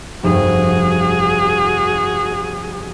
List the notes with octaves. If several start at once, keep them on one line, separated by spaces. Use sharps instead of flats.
F1 G2 F#4 G#4